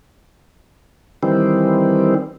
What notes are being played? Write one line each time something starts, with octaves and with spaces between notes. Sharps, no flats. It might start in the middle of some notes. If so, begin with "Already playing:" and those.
D#3 E3 G3 C4